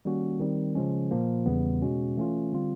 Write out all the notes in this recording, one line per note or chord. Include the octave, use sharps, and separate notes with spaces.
D#3 G3 A#3 C#4 F#4
D#3 G3 C4
C#3 F3 G#3 C#4
A#2 F3 A#3
E2 C#3 E3 G3 B3
B2 G#3 C#4 F#4
E3 A3 C#4 F4
D3 G3 C4 F4